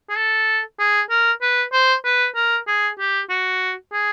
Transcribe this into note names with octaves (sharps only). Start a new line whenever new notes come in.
G#4
A4
G#4
A#4
B4
C5
B4
A#4
G#4
G4
F#4
G#4